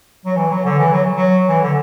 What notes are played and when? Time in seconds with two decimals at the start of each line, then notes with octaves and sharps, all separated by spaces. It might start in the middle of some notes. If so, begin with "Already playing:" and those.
0.25 F#3
0.36 E3
0.50 F#3
0.65 D3
0.78 E3
0.92 F#3
1.16 F#3
1.49 E3
1.62 D3